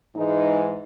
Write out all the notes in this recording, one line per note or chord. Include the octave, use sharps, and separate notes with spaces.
G#2 E3 G#3 D#4